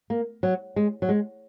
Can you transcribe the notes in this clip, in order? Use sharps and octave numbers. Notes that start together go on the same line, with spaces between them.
A#3
F#3
G#3
F#3
G#3